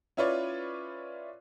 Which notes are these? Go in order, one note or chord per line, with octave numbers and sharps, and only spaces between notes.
C#4 E4 F4 B4 C#5 D5